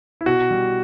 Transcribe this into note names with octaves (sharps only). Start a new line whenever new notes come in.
E4
B2 F#4
G3